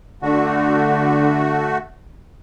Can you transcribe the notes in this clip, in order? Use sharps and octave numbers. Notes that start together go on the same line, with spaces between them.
D3 A3 F#4